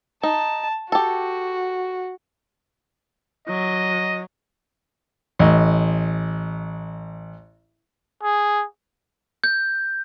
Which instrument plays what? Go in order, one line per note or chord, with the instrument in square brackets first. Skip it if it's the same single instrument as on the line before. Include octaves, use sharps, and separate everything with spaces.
[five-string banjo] D#4 [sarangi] A5
[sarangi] F#4 [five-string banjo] G4 A4
[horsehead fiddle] F#3 [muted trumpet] D#5
[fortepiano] A1 D#5
[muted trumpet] G#4
[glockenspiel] G6